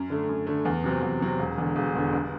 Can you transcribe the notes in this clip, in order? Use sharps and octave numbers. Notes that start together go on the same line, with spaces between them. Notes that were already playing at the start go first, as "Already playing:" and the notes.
Already playing: F#2
D3 A3
F#2
D3 A3
E2
C3 F#3 C4
E2
C3 F#3 C4
E1
E2 D3
E1
E2 D3
G1